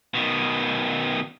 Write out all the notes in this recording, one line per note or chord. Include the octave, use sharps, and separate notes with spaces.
B2 D#3